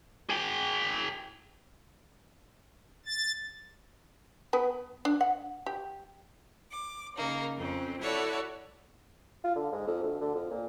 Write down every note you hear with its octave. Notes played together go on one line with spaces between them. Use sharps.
G#4 G5
A6
B3 B4
D4
F#5
G4
D6
C#3 A#3 D#4
F2 C4 C#4
E4 F#4 A4 C#5 D5
F4
D3
G#2
F2
D2
D3
F2
A#2